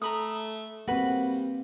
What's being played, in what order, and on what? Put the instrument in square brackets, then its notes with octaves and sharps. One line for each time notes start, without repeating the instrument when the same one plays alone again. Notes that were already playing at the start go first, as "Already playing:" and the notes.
[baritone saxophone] A3 [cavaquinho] A#5 B5 D#6
[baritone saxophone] G3 [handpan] A#3 C4 [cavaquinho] F#4 B4